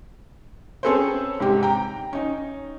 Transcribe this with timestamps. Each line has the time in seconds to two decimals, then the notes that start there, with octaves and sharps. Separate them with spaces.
0.83 C4 C#4 G#4 A4 B4 C5
1.40 G#2 C3 G4
1.63 G5 A#5
2.13 C#4 D#4